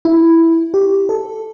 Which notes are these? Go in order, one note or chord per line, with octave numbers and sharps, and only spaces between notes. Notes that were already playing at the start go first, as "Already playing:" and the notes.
E4
G4
A4